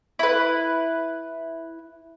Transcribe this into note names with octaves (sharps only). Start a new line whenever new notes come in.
E4 B4